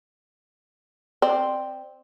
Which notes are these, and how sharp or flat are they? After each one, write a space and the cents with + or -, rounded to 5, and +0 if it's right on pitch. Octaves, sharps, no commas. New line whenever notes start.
C4 +0 D5 +25